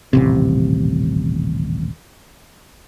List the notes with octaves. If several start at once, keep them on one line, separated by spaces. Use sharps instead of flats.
D#1 A1 C3